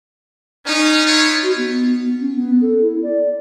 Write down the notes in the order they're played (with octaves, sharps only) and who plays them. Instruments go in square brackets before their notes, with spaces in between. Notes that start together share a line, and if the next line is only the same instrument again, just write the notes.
[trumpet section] C#4 [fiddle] D#4
[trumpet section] E4 F4 C#5
[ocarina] F#4
B3
C#4
B3
A4
E4
D5